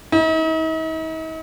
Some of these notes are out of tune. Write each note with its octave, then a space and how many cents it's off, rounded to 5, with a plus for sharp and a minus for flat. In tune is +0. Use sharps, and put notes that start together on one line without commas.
D#4 +45